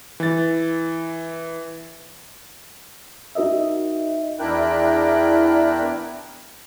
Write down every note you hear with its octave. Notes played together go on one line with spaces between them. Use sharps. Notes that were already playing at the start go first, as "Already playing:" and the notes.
E3 A6
D#4 F#4 A#4 D#5 E5
E2 D4 E4 A#4 G5 F#6